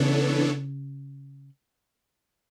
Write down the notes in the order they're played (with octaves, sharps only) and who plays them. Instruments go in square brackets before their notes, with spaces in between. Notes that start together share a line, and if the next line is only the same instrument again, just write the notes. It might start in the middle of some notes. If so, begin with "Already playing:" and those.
Already playing: [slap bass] C#3 [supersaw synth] E3 B3 D4 A4 C#5